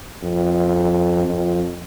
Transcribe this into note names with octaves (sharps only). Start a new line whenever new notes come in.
F2
F2